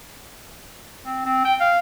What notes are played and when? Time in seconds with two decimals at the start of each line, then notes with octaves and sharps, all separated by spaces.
1.06 C4
1.26 C4
1.45 G5
1.60 F5